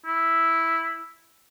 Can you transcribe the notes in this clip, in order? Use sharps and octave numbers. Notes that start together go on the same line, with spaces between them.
E4